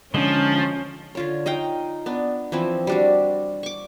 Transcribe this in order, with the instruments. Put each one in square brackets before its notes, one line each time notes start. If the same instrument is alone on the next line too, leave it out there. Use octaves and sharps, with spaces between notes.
[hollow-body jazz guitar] D3 G#3 D#4 [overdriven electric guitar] F3 [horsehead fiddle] C#4
[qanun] D3 F4 C#5
D#4 D#5 F5 G5
B3 D4
E3 F3 C4 E4
G3 D4 F#4
C#6 D6